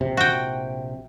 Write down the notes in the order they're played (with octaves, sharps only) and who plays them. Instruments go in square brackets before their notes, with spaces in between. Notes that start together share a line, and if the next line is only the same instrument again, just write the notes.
[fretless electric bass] A#1 C3
[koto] F#4 G5